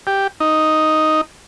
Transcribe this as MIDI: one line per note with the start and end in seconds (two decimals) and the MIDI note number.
0.07 0.27 67
0.40 1.21 63